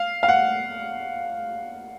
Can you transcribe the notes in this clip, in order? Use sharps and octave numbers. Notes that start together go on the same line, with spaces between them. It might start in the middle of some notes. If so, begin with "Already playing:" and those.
Already playing: F5
F5
F#5